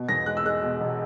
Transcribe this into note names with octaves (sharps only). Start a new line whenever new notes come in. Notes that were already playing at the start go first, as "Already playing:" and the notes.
Already playing: B2
E2 A#6
G#3 F#6
E6
G#3 F#6
B2
E1